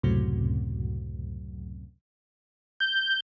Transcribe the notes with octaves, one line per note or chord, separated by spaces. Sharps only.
C#2 F#2 A2 C3 F#3
G6